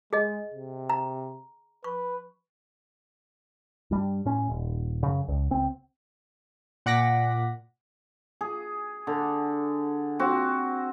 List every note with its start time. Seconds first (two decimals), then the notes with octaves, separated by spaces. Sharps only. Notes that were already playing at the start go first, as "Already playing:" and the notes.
0.13 G#3 G#4 D#5
0.54 C3
0.90 A#5
1.84 B4 C#6
3.91 G2 G3
4.25 A2 C#4
4.50 D#1
5.03 F#2 C#3
5.28 C#2
5.51 C#2 C4
6.86 A#2 F#5 D6 A#6 B6
8.41 G#4
9.07 D3
10.19 C4 F#4